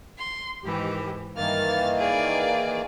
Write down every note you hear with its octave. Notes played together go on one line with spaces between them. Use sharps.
C6
G#2 D#3 E3 G4
G2 D#3 E3 A#3 F6 A6
G#4 D5